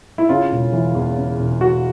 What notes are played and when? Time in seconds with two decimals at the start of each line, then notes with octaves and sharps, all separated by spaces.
0.18 E4
0.29 C#3 F4
0.51 E1
0.73 E3
0.95 E2
1.18 C#3
1.39 E1
1.61 E3 F#4